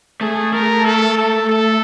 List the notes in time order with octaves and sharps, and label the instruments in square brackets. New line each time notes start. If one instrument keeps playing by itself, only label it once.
[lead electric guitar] A3 [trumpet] G#4
[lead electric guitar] A3 [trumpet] A#4
[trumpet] A4
A4
A4